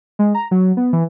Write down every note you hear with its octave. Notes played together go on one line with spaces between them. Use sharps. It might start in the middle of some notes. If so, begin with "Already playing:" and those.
G#3
A#5
F#3
B3
E3